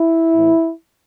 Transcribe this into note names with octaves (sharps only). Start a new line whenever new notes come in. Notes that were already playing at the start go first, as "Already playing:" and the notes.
Already playing: E4
A2 E3